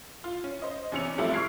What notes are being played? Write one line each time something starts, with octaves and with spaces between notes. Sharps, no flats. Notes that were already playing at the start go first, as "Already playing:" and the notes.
F4
C#4
C5 D#5
E2 C3 C#4 C#7 F7
G#2 C3 F3 G3 A3 E4
C#6 E6 F6 G#6 C7 D7